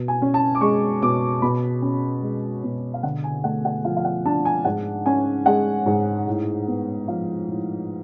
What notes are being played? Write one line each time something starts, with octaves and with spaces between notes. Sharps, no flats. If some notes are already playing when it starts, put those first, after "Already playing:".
Already playing: B2
G#5
C#4
A5
D6
G#3 C#6
B2 D6
B2 B5
C#4
G#3
B2
F5
D3 F#5
G#5
A3 F#5
F#5
F3 F5
F5
F#5
D4 A5
G#5
G#2 F#5
C#4 G#5
G#3 F#5
G#2
A2
B3
F3 F5
A2